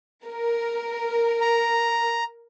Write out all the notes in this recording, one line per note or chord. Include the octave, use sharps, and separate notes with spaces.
A#4
A#5